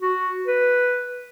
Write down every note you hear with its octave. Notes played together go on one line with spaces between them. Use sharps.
F#4
B4